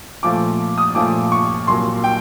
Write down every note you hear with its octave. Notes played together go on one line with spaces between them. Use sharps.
A#2 F3 A3 D6
D#6
A#2 F3 A3 D6
C#6
C2 A#2 F#3 A#3 C6
G5